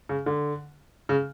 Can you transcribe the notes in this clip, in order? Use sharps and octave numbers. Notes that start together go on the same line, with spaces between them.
C#3
D3
C#3